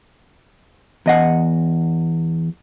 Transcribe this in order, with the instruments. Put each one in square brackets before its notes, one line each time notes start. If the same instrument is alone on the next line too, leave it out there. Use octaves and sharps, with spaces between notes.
[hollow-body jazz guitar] E2 D#5 F#5